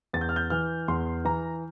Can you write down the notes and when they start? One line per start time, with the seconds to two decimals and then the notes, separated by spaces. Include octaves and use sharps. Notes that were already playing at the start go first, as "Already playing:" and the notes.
0.13 E2 A6
0.21 G6
0.29 F6
0.36 G6
0.50 E3 F6
0.88 E2 C6
1.25 E3 A#5